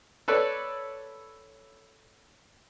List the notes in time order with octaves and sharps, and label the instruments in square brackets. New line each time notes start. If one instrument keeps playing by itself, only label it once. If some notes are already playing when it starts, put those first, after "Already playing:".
[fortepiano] A4 B4 C#5 D5